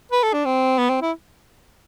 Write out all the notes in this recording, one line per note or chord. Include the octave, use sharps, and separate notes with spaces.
B4
A4
D4
C4
B3
C4
E4